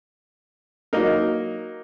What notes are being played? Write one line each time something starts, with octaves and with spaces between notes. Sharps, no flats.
F#3 A#3 D#4 A#4